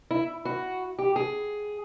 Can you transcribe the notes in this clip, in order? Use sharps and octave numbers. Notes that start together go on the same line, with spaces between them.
E4
F#4
G4
G#4